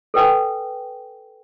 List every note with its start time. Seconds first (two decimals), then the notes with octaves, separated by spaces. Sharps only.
0.14 A4 B4 G5 G#5